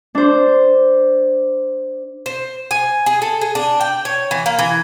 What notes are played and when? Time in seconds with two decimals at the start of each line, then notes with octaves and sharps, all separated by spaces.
0.15 D4 C5
2.26 C5
2.71 G#5
3.06 G#4
3.22 A4
3.41 G#4
3.55 D4
3.81 G5
4.05 C#5
4.31 E3
4.46 A#3
4.59 E3